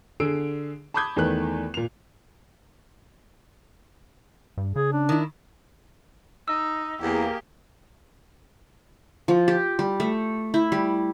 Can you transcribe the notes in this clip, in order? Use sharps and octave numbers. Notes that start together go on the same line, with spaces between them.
D3 G#4 E6 D7
A5 B5 D6 D#6 G6 G#6
E2 D#3 A3 B4 F#6
A#2 F7
G2
C#3 G#4
D4
D#3 E4
D#4 E6
E2 A#3 G4 G#4
F3
G4
G3
A3
E4
G3